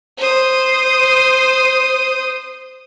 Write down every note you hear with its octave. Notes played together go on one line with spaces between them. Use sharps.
C5 D#6